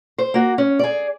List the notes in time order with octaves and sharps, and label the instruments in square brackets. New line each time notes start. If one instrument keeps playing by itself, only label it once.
[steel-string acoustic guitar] C5
A#3 F#4
C#4
G#4 D5